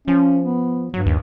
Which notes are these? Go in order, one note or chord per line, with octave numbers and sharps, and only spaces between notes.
F3 C#4
B3
G2 F#3
D#2